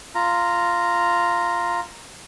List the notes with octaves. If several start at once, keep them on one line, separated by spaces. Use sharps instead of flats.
F4 A#5